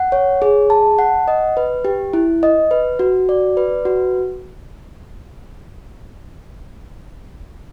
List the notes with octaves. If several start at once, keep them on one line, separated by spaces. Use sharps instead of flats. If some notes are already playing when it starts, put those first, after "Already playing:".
Already playing: F#5
C#5
G#4
A5
F#5
D#5
B4
G4
E4
D#5
B4
F#4
D5
B4
F#4